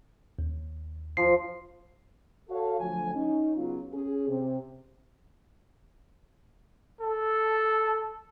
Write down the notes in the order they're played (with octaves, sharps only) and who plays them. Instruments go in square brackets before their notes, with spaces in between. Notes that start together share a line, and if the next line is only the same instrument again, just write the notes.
[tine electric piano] D#2
[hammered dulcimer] F3 [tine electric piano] C7
[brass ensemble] F#4 A4 C#5 F5
D2 F3 F#3 G#5
C#4 D#4
C#3 F#3 B3 C#4 F4
C#4 G#4
C3
[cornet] A4